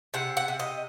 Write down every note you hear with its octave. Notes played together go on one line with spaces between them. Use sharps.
C3 F#5
F#5
C3
D#5